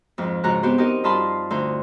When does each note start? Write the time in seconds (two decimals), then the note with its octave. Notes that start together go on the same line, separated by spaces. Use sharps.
0.18 F2 G#2
0.44 G#2 C#3 F#4 C5 A#5 F#6
0.63 B3 C4 F#4 G4 C5
0.78 D#4 F#4 G4 A#4 D#5
1.04 G2 D#4 F4 A5 B5 C6
1.50 D2 D#4 C5